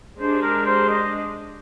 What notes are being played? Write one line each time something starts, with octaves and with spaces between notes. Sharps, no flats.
G#3 D4 G4 C5
A#4
C5
D#5